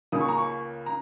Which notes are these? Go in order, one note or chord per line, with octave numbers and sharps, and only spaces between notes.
C#2 C#3 A#3 D#6
C#6
A#5
C#6
A#5